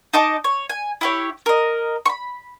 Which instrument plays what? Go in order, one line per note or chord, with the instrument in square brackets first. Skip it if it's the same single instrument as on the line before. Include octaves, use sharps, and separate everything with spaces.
[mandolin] D#4 D#5 A5 D6
C#5
G#5
E4 G4 C#5
A#4 D#5
B5 C#6